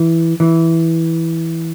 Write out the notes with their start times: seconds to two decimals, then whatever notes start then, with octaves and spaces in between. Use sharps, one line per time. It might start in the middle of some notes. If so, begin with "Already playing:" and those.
Already playing: E3
0.40 E3